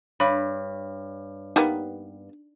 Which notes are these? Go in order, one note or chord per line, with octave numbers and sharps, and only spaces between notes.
G2 C#5 B5
G3 A#3 B3 D#4